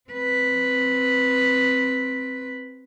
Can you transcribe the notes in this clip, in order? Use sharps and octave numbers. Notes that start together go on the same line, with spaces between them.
C4 B4